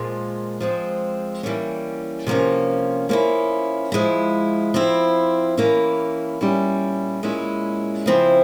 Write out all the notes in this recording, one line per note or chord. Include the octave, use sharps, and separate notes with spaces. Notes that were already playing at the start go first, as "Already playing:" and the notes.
Already playing: A#2 F3 G#3
F3 G#3 C4
E3 G3 A#3 C#4
C3 F3 A#3 C#4
F3 A#3 C#4 E4
F3 G#3 E4
F3 C4 E4
E3 A#3 C#4 E4
A#2 G3 C#4 E4
A#2 G#3 C#4 E4
C#3 F3 C4 E4